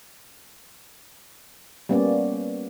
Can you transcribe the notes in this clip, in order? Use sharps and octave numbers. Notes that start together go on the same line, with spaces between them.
G3 A#3 B3 C#4 D5